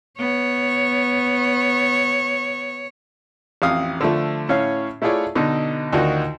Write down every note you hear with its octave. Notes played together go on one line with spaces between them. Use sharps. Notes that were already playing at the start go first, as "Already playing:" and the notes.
B3 C#5
A1 F2 F5 D#6
D3 F3 A3
A2 C#4 C#5 F5
A3 E4 F4 G#4 C#5 D5
B2 D3 D#4
D2 D#3 D#4 F4 F#4